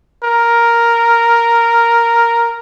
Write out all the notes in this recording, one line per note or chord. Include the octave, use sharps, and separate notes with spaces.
A#4